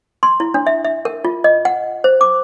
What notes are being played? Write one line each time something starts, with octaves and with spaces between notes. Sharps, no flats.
C6
E4
D4
E5
E5
A#4
F4
D#5
F#5
C5
D6